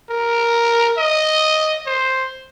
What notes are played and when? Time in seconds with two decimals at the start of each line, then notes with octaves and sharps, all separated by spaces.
0.10 A#4
0.97 D#5
1.86 C5